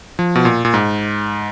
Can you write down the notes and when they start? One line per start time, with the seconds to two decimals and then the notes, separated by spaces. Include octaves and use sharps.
0.19 F3
0.35 B2
0.45 A#2
0.65 A#2
0.74 G#2